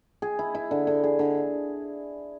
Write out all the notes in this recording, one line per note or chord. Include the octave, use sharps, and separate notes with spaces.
G#4
E4
E4
D3
D3
G#4
D3